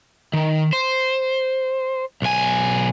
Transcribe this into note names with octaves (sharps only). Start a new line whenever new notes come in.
D#3
C5
B1 G#5